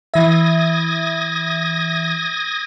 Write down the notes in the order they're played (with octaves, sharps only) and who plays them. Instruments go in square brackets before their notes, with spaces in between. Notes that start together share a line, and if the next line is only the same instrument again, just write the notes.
[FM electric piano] E3 E5 [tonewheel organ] D#6 G#6 A#6